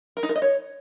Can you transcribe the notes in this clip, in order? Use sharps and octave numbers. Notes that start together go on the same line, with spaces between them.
A#4
D#4
A#4
D#5
C#5